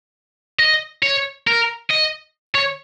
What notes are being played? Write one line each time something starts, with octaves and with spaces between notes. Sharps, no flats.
D#5
C#5
A#4
D#5
C#5